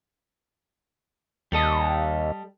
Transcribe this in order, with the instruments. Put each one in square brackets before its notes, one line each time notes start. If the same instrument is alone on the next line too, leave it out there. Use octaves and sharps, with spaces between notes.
[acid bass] D#2 [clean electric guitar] G3 A4 D#5